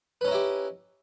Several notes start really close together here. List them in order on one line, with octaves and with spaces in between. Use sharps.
B4 C#4 D#4 E4 G4